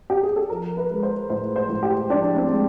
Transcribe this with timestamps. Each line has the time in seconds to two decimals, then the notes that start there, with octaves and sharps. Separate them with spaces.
0.10 G4
0.23 G#4
0.36 A4
0.50 F3 A#4
0.77 B4
0.90 G#3
1.03 C5
1.30 A2 C5
1.56 C5
1.69 A2
1.83 G4
2.09 F3 D4
2.37 C4
2.49 G#3